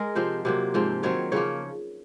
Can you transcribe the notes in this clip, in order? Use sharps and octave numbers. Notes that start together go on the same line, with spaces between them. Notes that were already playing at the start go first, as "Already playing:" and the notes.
Already playing: G#3 G#4 A#4
C3 F3 C4 C5
C3 F#3 A#3
G#2 F3 C4
D#3 F#3 C4 C#5
C#3 F3 A#3 C#5